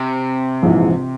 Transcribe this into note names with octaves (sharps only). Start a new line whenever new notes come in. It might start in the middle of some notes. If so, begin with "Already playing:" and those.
Already playing: C3
A#1 G#2 E3